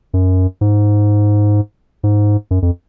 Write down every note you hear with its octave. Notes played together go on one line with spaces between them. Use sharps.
F#2
G#2
G#2
F#2
F2